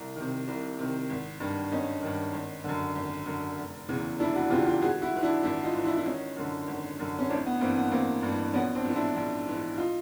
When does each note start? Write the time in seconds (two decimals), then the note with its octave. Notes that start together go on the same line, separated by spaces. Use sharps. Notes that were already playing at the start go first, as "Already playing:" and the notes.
Already playing: C2
0.16 C3 D#3
0.48 C2
0.78 C3 D#3
1.10 G#1
1.40 G2 D#3
1.71 G#1 C#4 D#4
2.02 G2 D#3
2.33 G#1
2.64 F#2 D3
2.95 G#1
3.26 F#2 D3
3.58 F1
3.88 E2 C#3 E3
4.19 F1 D4 E4
4.35 E4 F#4
4.50 E2 C#3 E3 F4 G4
4.66 F4 G4
4.81 G#1 F#4 G#4
5.02 E4 F#4
5.13 G#2 E3
5.23 D4 E4
5.43 G#1 D4 E4
5.64 D#4 F4
5.74 G#2 E3
5.85 D4 E4
5.97 E4
6.06 G#1 C#4 D#4
6.36 F#2 D3
6.67 G#1
6.99 F#2 D3
7.19 C#4
7.29 A1 C4 D4
7.46 B3
7.61 G2 E3 A#3 C4
7.76 B3
7.91 A1 A#3 C4
8.22 G2
8.28 E3
8.54 A#1 B3 C#4
8.75 C4 D4
8.85 G#2 E3
8.95 D4 E4
9.16 A#1
9.47 G#2 E3
9.78 D#4 F4